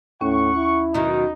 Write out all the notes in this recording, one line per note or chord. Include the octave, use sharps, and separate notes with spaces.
D#2 A2 C#4 F#5 C#6
E4
B2 D#3 F#3 D#4